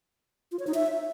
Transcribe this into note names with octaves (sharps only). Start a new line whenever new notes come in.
F4
C#5
D#4
E5